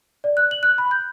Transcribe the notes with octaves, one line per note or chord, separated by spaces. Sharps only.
D5
F#6
F#7
F#6
B5
G6